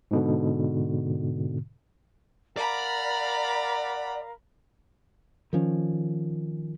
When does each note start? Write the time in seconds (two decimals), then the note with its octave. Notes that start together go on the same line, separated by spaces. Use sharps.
0.11 G#2 B2 D3
2.57 A#4 D5 F5 F#5 A#5 B5
5.53 D#3 F3 C#4